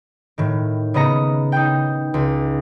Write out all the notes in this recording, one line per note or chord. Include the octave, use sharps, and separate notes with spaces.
A2 D#3
C#3 B3 D#5 A#5 C#7
D#4 G5
C#2